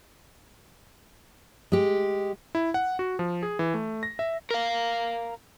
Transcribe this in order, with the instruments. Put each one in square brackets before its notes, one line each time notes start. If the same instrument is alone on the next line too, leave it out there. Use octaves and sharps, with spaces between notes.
[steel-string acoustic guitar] G#3 G4
[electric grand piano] E4
F#5
F#4
F3
G#4
E3
A3
A#6
E5
[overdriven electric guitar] A#4 F5